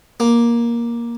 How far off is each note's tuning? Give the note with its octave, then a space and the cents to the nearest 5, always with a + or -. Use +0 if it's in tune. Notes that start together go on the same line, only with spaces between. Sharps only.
A#3 +10